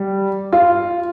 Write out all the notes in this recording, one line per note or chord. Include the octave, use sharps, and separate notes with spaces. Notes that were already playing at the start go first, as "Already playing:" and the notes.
Already playing: G3
F4